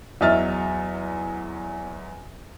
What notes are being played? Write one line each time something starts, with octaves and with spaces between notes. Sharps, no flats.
E2 F#3 D#5 E5 F6 A6